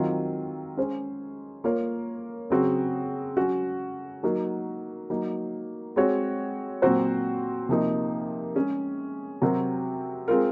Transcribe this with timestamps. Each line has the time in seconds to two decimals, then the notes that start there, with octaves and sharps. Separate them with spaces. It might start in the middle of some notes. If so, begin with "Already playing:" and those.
Already playing: D#3 F#3 C4 F4
0.77 G#3 C#4 G#4 C5
1.64 A#3 F4 A#4 C#5
2.50 C#3 F#3 C4 F#4
3.37 F#3 C#4 F#4
4.23 F#3 A#3 D#4 F#4 A#4
5.10 F#3 A#3 D#4
5.96 G#3 C4 F#4 C#5
6.82 A#2 F#3 C4 F#4 C5
7.69 C3 F3 A#3 D#4
8.55 G#3 C#4 G#4
9.42 C3 F#3 C4 F#4 A#4
10.28 G#3 C4 F4 A#4